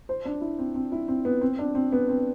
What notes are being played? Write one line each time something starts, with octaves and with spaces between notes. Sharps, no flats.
C5
D4
E4
C4
C4
E4
C4
B3
C4
D4
C4
B3
C4